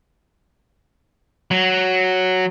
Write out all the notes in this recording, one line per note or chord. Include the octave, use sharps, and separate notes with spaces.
F#3